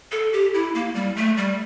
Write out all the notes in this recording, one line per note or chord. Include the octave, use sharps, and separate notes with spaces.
A4
G4
E4
A#3
G3
A3
G3